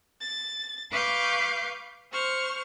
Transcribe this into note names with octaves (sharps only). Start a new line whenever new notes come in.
A6
B4 F5 C#6 D6 F6 G6
C5 C#6 F6